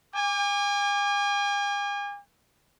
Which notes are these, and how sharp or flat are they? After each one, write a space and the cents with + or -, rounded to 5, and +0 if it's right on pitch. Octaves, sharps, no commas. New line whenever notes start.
G#5 -40 D6 +0